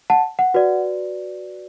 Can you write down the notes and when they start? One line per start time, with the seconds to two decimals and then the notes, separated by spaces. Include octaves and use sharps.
0.10 F#5 A5
0.39 F#5
0.54 F#4 B4 D5